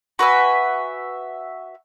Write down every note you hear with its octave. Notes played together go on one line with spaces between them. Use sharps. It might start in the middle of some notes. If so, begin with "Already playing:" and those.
F#4 B4 E5 G#5